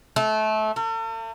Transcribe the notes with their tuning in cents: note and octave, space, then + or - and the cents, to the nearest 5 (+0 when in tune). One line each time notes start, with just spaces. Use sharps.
A3 -25
A3 +45